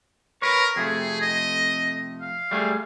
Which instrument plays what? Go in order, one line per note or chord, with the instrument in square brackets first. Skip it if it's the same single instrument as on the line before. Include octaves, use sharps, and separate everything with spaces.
[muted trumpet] A#4 [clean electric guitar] B4 C#5
[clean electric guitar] F2 C3 A3 [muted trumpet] G#4
[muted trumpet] D#5
F5
[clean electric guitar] G3 A3 G#4